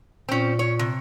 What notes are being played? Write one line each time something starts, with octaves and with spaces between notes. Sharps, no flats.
A#2 C4 C#4
C#5
C3